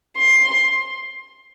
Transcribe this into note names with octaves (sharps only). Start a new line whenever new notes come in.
C6